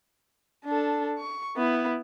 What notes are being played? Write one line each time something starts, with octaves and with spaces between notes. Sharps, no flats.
D4 A4
C#6
B3 E4